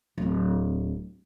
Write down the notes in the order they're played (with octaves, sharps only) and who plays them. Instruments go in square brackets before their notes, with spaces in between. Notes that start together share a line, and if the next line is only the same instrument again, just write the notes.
[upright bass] D1 C4